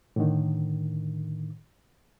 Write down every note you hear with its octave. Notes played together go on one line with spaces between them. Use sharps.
A2 D3 D#3